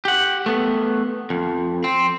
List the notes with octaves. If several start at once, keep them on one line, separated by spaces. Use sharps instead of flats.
G4 F#5
A3 B3
F2
C4